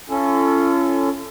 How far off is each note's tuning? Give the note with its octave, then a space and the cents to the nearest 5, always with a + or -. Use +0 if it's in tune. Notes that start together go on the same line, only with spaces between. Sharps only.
C#4 +0 F4 -45 A4 +0